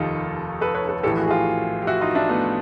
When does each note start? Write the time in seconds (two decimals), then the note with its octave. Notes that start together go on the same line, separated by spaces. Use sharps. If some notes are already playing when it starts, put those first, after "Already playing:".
Already playing: F1 D#2 D#3 D#4 F4 G4 A4
0.61 A4 B4
0.75 B4 C#5
0.89 A4 B4
1.03 A#1 A2 E3 G4 A4
1.17 F#4 G#4
1.27 G#4
1.31 F4 G4
1.82 G4
1.87 E4 F#4
2.01 D#4 F4
2.15 D4 E4
2.29 A3 B3